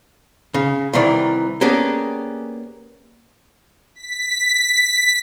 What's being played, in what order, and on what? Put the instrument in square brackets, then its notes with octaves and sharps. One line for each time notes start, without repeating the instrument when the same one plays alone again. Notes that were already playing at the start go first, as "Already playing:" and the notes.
[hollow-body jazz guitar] C#3
C2 D#3 E3 D5
A#3 B3 C#4 D4 G4 G#4
[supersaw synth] B6